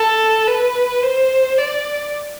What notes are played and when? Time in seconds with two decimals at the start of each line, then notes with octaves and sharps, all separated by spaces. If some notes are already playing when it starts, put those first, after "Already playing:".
Already playing: A4
0.47 B4
1.03 C5
1.58 D5